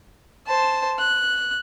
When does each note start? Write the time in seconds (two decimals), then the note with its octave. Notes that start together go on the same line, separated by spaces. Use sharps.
0.47 C5 A5
0.99 F#6